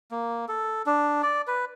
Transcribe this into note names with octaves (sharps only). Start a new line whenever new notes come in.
A#3
A4
D4
D5
B4